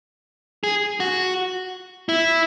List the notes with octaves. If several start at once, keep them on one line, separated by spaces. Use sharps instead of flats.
G#4
F#4
E4